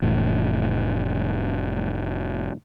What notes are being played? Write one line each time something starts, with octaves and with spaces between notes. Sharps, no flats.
F1 A2 E3